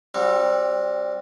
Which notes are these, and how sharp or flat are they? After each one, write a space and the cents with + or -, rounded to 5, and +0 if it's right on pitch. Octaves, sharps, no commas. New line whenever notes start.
G3 +0 C4 +20 F#4 -25